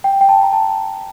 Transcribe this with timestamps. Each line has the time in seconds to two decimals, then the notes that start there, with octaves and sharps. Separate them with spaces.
0.04 G5
0.21 G5
0.29 A5
0.43 A#5
0.53 A5
0.69 A5